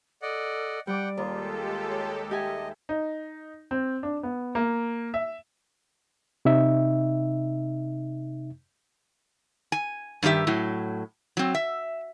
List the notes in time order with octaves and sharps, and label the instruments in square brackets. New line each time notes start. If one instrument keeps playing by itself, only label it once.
[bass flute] A4 [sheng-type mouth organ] D5 D#5 F#5
[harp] G3 D6 [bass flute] D5 [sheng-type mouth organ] F#5 G5
[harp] D#2 [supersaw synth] G#3 G4 A4 [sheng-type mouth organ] F4
[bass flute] C#5
[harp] G4 G#5 [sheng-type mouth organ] D#5 [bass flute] E5
[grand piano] D#4
C4
D4
B3
A#3
E5
[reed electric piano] C3 D#4 E5
[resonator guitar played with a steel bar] G#5
G2 D#3 C4 G4 E5
A2 F#3
F#3 C4
E5